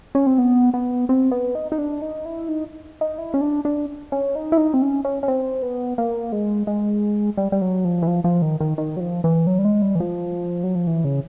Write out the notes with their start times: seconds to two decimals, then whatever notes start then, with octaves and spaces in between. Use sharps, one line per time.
0.15 C#4
0.26 C4
0.38 B3
0.74 B3
1.09 C4
1.31 B3
1.55 D#4
1.72 D#4
1.78 D4
2.02 D#4
2.26 E4
2.48 D#4
3.01 D#4
3.18 E4
3.34 C#4
3.41 D4
3.65 D4
4.12 C#4
4.35 D#4
4.52 E4
4.57 D#4
4.74 C4
4.82 C#4
5.05 C#4
5.23 C#4
5.28 C4
5.62 B3
5.98 A#3
6.32 G#3
6.67 G#3
7.37 G3
7.52 G3
7.61 F#3
7.85 F3
8.02 E3
8.07 F3
8.24 F3
8.42 D#3
8.60 D#3
8.78 D#3
8.97 F#3
9.00 F3
9.24 E3
9.47 F#3
9.58 G3
9.65 G#3
9.82 G3
9.95 E3
10.00 F3
10.63 F#3
10.75 F3
10.87 E3
11.04 C#3